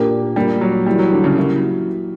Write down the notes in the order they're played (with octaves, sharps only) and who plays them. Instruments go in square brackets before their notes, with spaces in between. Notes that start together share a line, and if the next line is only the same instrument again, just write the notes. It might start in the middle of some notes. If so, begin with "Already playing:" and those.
Already playing: [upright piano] A#2 A#3 D4 G4
[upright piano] A#2 A#3 D4 G4 [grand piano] G3
[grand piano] F#3
[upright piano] E3 A#3 E4 G4 [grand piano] G3
[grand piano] F#3
D3
C#3
[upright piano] F#3 A#3 E4 G4